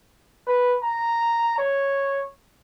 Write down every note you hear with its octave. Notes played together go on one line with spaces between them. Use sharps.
B4
A#5
C#5